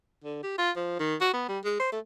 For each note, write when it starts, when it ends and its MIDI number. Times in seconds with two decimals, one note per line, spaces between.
0.24 0.40 50
0.43 0.55 67
0.58 0.71 65
0.76 0.99 53
0.99 1.15 51
1.21 1.32 66
1.33 1.47 59
1.49 1.59 55
1.64 1.78 56
1.80 1.91 72
1.92 1.99 57